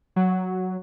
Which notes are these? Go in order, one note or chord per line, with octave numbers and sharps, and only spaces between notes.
F#3